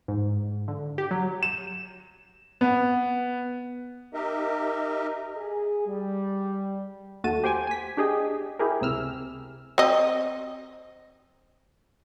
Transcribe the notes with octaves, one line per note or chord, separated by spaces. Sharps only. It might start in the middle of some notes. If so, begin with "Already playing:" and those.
G#2
D3
G4
F#3
E7
B3
D#4 G4 A#4 D#5 E5
G#4
G3
D#2 A3 F#4 A5 D#7
G4 C5 G5 G#5
G#5 B6
D4 G4 G#4 D#5
E4 G4 G#4 A#4
C#2 C3 E6 F6
C4 D#5